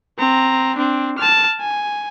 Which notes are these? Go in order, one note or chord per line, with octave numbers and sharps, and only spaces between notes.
C4 A#5
C4 D4
A5 F6
G#5